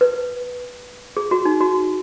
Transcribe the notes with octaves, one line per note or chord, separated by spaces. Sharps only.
B4
G#4
F#4
D#4
F#4